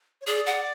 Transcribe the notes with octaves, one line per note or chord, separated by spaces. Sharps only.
C#5
G#4 D5
F#5